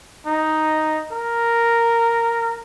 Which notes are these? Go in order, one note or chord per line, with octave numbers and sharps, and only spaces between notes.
D#4
A#4